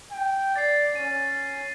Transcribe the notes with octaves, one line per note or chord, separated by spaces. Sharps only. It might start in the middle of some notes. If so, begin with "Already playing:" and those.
G5
D5 A6 C7
C#4 D#7